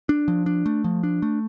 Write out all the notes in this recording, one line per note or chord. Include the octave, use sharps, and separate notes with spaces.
D4
F3
D4
A3
F3
D4
A3